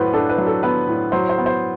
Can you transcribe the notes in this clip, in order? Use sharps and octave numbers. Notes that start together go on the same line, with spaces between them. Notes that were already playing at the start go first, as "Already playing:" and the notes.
Already playing: A2 F#3 B3 B4 C5
D4 A4
B4
F#3
A4
B3 B4
A2
F#3 C5
C5
B3
C5